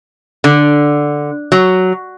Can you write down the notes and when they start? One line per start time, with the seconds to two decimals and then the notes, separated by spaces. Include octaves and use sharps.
0.44 D3
1.52 F#3